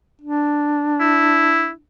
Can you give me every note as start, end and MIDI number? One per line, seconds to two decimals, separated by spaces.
0.21 1.80 62
1.00 1.70 64